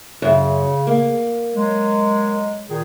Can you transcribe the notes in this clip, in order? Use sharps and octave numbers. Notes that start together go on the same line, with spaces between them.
F#2 C#3
A#3
F#3 G#3
A#2 D#3 G#4